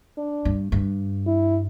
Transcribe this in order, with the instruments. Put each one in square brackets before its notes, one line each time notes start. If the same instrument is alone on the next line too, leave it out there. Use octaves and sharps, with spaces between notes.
[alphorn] D4
[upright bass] G2
G2
[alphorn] E4